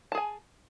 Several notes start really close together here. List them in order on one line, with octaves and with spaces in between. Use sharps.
A5 G#4 G#5